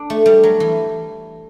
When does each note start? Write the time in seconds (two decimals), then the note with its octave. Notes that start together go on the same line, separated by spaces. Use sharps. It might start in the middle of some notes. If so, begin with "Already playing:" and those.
Already playing: D4
0.10 A3
0.26 G3
0.43 F#3
0.60 E3